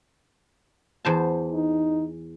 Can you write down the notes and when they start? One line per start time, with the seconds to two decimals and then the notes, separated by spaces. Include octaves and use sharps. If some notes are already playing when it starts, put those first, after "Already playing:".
1.05 E2 C5 A5
1.52 D#4